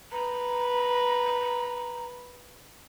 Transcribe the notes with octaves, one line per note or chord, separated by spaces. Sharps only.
B4 A#5